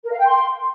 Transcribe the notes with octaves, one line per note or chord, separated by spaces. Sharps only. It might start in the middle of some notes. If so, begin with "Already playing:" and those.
A#4
F5
G5
C6